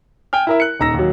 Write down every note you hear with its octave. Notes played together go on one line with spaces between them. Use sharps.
G5 G#5 F6
E4 A#4 E5
F#6 C#7
D#1 D#4 A#5 E6 A#6
D#2 F#3